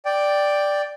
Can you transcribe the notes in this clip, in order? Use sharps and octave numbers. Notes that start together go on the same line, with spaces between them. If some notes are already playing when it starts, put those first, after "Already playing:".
D5 G5